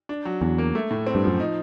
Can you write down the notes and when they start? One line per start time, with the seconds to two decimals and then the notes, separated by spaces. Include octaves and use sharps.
0.09 D4
0.25 F#3
0.41 E2 F#3
0.58 A#3
0.75 A3
0.91 A2
1.07 C4
1.15 G2
1.24 F#2 F3
1.40 D#4